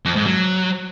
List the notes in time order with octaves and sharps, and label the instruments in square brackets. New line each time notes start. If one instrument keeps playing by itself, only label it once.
[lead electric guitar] F2
G#2
F#3